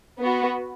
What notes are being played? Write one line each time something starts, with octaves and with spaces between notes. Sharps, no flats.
B3 F#4